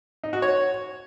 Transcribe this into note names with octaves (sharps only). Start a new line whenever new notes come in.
D#4
F#4
C#5